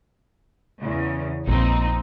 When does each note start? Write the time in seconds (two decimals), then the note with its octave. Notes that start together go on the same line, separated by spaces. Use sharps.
0.81 E2 C#3
1.47 A#1 F2 A#3 C4 D#4